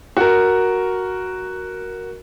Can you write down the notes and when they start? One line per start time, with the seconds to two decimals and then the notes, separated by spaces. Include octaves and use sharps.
0.17 F#4 A#4